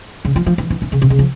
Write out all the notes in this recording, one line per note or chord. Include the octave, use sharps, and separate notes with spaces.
C#3
F3
F3
E3
E3
E3
C#3
C3
C#3
F3